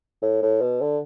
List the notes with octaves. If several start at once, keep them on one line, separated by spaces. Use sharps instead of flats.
A2
A2
B2
D3